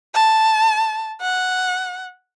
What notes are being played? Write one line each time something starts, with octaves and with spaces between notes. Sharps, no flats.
A5
F#5